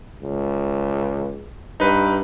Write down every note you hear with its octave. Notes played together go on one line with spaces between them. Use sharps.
C#2
G2 D#4 B4